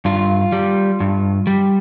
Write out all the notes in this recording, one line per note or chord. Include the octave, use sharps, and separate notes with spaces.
G2 F4
G3
G2
G3